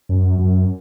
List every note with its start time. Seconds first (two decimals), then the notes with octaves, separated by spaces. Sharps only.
0.09 F#2
0.39 F#2